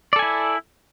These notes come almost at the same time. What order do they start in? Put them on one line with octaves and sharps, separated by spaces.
D5 A4 G#5 E4